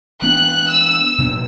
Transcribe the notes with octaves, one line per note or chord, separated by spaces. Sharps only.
E3 B3 D4 F#6
E6
B2 F#3 B3 D4